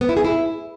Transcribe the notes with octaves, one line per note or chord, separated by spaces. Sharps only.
B3
E4
G#4
E4